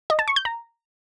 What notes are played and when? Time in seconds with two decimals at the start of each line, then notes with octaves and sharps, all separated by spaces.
0.10 D#5
0.19 A5
0.28 C#6
0.36 G6
0.45 A#5